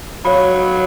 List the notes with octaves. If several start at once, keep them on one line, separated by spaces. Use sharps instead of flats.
F#3 C#5 F5 B5